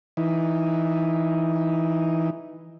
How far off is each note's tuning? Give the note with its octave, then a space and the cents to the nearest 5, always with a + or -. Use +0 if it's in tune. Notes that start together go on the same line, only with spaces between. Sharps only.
E3 +0 D#4 +5